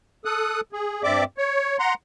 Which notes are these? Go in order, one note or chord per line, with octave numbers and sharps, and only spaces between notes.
A4 D#6 F#6
G#4
G2 C4 D5 E5 D6
C#5
F#5 A#5 C6